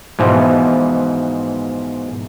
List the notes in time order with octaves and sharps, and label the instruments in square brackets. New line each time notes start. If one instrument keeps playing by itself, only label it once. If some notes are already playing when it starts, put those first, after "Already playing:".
[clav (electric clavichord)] G#2 B2 E3 F3